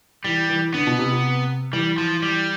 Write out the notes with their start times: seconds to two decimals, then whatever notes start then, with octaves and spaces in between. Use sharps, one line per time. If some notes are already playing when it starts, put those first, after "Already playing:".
0.24 E3 G3
0.50 E3
0.74 D3 B3
0.87 B2
0.99 C3
1.11 C3
1.73 E3 G3
1.98 F3
2.22 G3